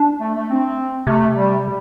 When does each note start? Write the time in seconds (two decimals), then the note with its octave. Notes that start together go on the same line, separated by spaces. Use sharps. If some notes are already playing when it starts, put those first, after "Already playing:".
Already playing: D4
0.20 A3
0.34 A3
0.49 C4
1.07 C3 A3
1.35 G3
1.64 G3